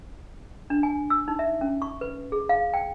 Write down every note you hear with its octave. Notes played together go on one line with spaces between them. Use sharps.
D4
G#5
E6
D#4
E5
C#4
C#6
B4
G#4
F5
G5